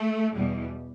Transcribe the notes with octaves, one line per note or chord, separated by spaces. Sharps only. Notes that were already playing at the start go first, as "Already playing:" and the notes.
Already playing: A3
E2 B2 G3